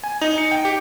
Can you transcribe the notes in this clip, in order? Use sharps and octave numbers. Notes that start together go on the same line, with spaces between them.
G#5
D#4
C#7
G5
G4